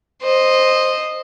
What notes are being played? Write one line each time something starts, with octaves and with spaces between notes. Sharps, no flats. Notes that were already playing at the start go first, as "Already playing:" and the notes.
C5 D#5